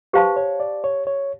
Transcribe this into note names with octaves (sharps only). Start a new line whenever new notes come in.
G4 B4 C5 F5 A5 C6
C#5
D5
C#5
C#5